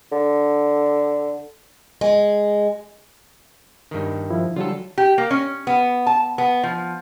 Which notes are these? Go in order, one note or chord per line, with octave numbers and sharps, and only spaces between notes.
D3
G#3
G2 D#3
F3 E4
D3 F#3 G3 F4 A4
G4
A#3
C#4
B3
A5
B3
F3